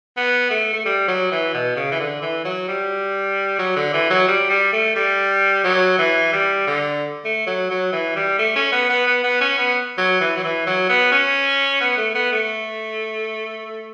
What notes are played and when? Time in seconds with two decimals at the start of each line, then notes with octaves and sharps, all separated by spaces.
0.17 B3
0.51 A3
0.73 A3
0.86 G3
1.08 F#3
1.32 E3
1.54 B2
1.77 C#3
1.92 E3
2.00 D3
2.22 E3
2.45 F#3
2.69 G3
3.59 F#3
3.76 D3
3.94 E3
4.10 F#3
4.28 G3
4.50 G3
4.73 A3
4.96 G3
5.64 F#3
5.99 E3
6.33 G3
6.67 D3
7.25 A3
7.47 F#3
7.70 F#3
7.93 E3
8.16 G3
8.39 A3
8.56 C#4
8.72 B3
8.90 B3
9.07 B3
9.24 B3
9.41 C#4
9.58 B3
9.98 F#3
10.21 E3
10.36 F#3
10.44 E3
10.67 F#3
10.89 B3
11.12 C#4
11.81 B3
11.98 A3
12.15 B3
12.32 A3